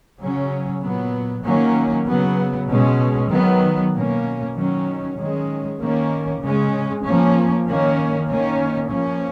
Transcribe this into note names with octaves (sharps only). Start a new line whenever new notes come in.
C#3 F#3 C#4
A#2 F#3 B3
D#3 F#3 A#3 C#4
C#3 F#3 B3
B2 G#3 C#4
D#3 F#3 B3
B2 A#3 C#4
D#3 F#3 C#4
D#3 G#3 C#4
D#3 A#3 C#4
C#3 G#3 C#4
F3 A#3 C#4
D#3 A#3 C#4
D#3 A#3 C#4
F3 A#3 C#4